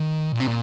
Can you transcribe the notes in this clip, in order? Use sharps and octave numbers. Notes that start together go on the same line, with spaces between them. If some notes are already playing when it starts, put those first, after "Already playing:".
Already playing: D#3
A#2
C3
A#2